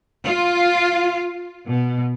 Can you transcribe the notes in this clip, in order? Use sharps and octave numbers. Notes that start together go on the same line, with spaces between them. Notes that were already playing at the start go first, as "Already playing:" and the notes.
F4
B2